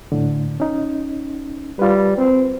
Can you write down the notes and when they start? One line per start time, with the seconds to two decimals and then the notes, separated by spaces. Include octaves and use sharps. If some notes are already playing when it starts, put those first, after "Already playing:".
0.12 A2 D3
0.60 C#4 D#4
1.79 G3 F4 B4
2.17 C4